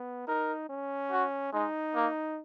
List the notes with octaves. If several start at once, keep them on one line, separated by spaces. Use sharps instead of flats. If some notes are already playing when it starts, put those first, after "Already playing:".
Already playing: B3
D#4 A#4
C#4
F#4
G#3 D#4
A#3